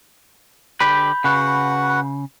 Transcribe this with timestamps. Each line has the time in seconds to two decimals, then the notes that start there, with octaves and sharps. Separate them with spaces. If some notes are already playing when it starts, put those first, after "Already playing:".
0.80 D3 G4 B4 B5 G6
1.24 C#3 F#4 B4 F#5